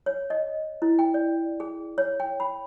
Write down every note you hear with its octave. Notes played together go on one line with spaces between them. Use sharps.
C#5
D#5
E4
G5
D5
G#4
C#5
G5
B5